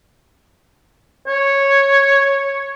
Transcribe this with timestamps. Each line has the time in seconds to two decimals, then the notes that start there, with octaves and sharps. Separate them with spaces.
1.28 C#5